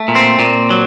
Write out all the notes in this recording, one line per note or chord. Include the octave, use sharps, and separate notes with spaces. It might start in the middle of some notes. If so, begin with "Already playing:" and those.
Already playing: A3
A#2
C4
A#2
F#3